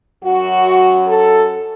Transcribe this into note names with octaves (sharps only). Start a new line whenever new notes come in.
F#2 F#3 F#4
A4